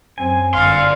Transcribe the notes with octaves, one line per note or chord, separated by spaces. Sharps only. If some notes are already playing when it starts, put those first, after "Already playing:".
F#2 C4 G#5
G1 D5 F5 C6